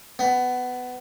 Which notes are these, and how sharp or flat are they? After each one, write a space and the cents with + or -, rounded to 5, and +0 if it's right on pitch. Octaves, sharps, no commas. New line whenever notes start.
B3 +15